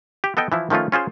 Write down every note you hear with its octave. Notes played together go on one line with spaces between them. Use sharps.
G4
B3 A4 D#5 G5
E3 F3 E4
D#3 F3 A3 C#4 F4
C#4 F4 G#4 C5